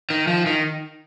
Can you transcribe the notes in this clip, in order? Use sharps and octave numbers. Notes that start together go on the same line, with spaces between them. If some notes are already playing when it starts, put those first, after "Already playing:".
D#3
F3
D#3